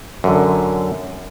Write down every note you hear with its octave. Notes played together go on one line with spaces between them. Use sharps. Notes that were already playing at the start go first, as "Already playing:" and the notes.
F#2 D3